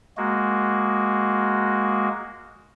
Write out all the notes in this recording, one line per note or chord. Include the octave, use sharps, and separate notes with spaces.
G#3 A#3 F#4